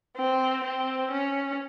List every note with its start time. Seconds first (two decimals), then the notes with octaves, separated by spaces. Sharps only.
0.16 C4
0.64 C4
1.11 C#4